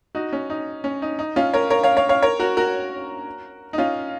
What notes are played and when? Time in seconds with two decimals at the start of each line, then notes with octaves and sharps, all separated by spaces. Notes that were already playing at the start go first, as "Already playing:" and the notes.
0.15 D#4 F#4
0.33 C#4
0.50 D#4
0.84 C#4
1.02 D#4
1.19 D#4
1.36 C#4 F4
1.54 A#4 C#5
1.70 A#4 C#5
1.83 C#5 F5
1.97 C#5 F5
2.09 C#5 F5
2.23 A#4 C#5
2.40 F#4 A#4
2.57 F#4 A#4
3.73 D#4
3.78 C#4 F4